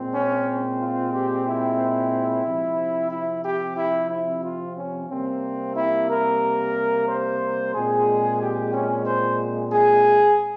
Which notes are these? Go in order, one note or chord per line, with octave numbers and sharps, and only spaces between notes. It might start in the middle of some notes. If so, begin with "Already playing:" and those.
Already playing: A#2 G#3 C4
C#4
F4
G4
E4
C3 F3 C4
E4
G4
E4
E4
F4
C#4
C3 G3 A#3 C4
E4
A#4
C5
A#2 G#3 C4 G#4
G4
C#4
C5
G#4